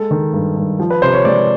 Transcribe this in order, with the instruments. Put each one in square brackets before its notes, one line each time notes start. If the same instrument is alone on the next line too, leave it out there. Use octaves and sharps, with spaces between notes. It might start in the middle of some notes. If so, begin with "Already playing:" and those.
Already playing: [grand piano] G#3 A4
D#3
G2
G2
F3
B4
C3 C5
C#5
G#3 D5